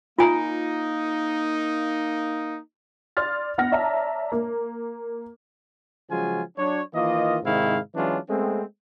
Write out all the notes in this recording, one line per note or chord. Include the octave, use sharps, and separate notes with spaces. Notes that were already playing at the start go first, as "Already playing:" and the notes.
A#3 D#4 F4 G#5 A#5
D5 C6 F6 A6
B3 F#5 F6 A#6
C#5 D5 E5 A5 A#5
A#3
C#3 F3 F#3 G#3 F4 G#5
F#3 D4 C#5
D#3 E3 A#3 F4 D#5
G#2 C3 D#3 G#3 E4 F5
E3 F#3 G#3 C#4 D4 F4
G#3 A3 B3 C4